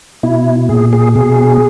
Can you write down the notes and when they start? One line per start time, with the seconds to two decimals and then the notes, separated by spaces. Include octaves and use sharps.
0.23 B2 E4
0.69 A#2 G#4
0.93 G#4
1.15 B2 G#4